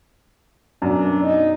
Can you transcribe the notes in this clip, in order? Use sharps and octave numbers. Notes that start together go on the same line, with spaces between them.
F#2 B2 D4
D#4